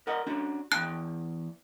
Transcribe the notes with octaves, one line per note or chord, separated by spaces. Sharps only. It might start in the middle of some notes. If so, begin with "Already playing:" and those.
A#4 D#5 F#5
C#4 D4 F#4
E2 G5 A5 F#6